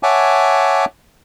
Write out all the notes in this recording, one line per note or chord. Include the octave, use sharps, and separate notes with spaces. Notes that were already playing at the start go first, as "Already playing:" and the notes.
C#5 E5 F#5 G#5 A5 D6